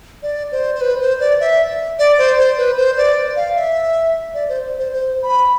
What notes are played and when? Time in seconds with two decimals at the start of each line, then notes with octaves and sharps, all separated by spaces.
0.23 D5
0.52 C5
0.75 C5
0.81 B4
1.01 C5
1.20 D5
1.40 E5
1.99 D5
2.18 C5
2.38 C5
2.58 B4
2.78 C5
2.97 D5
3.36 F5
3.56 E5
4.34 D5
4.49 C5
4.78 C5
4.93 C5
5.22 B5